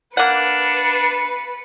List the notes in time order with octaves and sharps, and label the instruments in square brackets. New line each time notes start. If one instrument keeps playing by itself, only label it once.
[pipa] A#3 F#5 [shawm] D4 [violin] B4 C#7